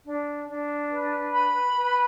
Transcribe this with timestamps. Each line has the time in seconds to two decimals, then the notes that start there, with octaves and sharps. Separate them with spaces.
0.06 D4
0.48 D4
0.91 B4
1.33 B5
1.76 B4